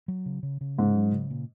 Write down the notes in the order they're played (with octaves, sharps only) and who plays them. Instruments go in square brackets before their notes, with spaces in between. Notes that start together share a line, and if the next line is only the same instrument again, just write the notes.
[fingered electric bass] F#3
C#3
C#3
C#3
[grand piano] G#2 [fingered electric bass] C#4
[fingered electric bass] F#3
C#3
A#2